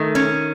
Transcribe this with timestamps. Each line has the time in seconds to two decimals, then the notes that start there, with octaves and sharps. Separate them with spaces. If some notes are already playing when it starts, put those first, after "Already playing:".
Already playing: D#3 A3
0.15 C#4